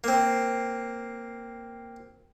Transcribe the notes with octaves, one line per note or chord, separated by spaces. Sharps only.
A#3 C4